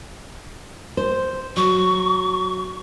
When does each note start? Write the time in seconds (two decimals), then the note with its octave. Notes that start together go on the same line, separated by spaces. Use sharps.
0.97 C5
1.57 F#3 C#6